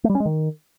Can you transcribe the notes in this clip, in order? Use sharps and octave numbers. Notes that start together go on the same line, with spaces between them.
A3
G3
C#4
G#3
D#3